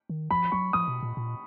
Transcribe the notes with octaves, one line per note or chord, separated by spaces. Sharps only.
D#3
F3 B5
F#3 C#6
F3 D#6
B2
A#2
A#2